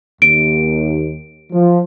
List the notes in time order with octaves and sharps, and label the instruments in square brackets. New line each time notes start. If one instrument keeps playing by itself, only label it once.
[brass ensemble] D#2 [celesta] D7
[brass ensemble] F3